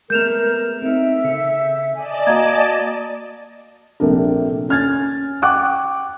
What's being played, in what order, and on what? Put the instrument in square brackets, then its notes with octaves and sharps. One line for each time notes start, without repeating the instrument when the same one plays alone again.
[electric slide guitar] G#3 A3 B3 [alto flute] A#4 [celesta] G6 E7 F7
[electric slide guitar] C4 D#4 [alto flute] E5
[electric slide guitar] C#3 A4
[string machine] D5 D#5 A5 [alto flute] G#5
[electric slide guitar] A#3 F#4 [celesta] F5 A#5 G#6
[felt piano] A#1 C3 A3 D4 A#4
C#4 F6 G#6 A6
F#5 G5 C#6 D6 F#6